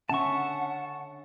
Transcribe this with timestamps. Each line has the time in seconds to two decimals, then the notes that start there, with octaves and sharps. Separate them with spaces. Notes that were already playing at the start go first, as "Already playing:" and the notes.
0.09 D3 C#4 E5 F#5 A5 C#6